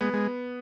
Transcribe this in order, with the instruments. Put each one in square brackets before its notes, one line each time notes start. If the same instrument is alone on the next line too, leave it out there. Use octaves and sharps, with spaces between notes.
[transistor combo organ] G#3 [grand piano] B3
[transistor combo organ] G#3